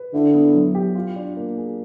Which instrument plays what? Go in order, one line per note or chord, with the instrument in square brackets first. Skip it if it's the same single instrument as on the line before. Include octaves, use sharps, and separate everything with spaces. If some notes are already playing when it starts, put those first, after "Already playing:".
Already playing: [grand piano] B4
[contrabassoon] D3 [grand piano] E4
[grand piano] B3
F#3
G4
F4
D4
A#3
G#4